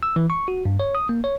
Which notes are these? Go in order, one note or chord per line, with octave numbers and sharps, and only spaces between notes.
E6
E3
C#6
F#4
G2
C#5
D#6
A#3
C#5